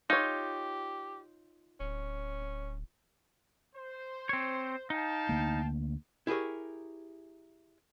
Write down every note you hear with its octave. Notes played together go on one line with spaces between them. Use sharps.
D#4 F4 G4 C#5
D1 C#4
C5
C4 C#5
D#4 F5 G5 A5
D2 A#3
E4 G4 G#4 A#4 C#5